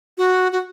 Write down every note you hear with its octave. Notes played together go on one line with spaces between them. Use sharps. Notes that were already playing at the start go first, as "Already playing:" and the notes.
F#4
F#4